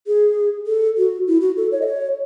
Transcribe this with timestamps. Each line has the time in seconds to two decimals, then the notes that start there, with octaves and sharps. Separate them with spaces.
0.07 G#4
0.67 A4
0.97 F#4
1.27 E4
1.41 F#4
1.57 A4
1.72 C#5
1.81 D#5
1.86 C#5